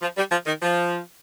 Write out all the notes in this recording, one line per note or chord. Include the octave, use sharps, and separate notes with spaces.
F3
G3
F3
D#3
F3